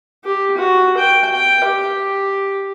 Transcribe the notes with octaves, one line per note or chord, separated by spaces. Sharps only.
G4
F#4
G5
G5
G4